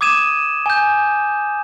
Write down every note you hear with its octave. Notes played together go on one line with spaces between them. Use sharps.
D6 D#6 G#6 D#7 E7
G#5 G6